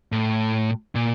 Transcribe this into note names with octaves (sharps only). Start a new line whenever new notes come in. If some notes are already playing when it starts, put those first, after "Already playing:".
A2
A#2